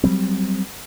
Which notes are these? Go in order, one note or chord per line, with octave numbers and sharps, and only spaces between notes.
F#3 G3 C4